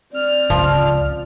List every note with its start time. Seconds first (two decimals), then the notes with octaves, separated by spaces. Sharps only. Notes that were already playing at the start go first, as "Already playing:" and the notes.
0.13 C4 D5 F6
0.50 C#2 F3